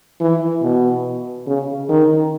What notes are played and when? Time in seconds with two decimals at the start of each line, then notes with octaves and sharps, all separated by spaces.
0.21 E3
0.63 B2
1.47 C#3
1.89 D#3